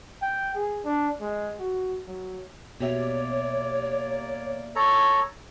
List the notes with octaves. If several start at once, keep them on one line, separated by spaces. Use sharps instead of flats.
G5
G#4
D4
G#3
F#4
F#3
B2 A#3 G4 C#5 D5 E5
A4 C#5 A#5